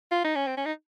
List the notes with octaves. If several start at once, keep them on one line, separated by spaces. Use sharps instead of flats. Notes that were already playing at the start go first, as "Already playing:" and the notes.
F4
D#4
C#4
C4
C#4
D#4